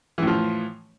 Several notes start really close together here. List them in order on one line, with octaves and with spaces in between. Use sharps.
E3 A2 F3